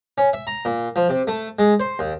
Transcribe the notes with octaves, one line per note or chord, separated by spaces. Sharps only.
C#4
E5
A#5
A#2
F3
C3
A3
G#3
C5
D#2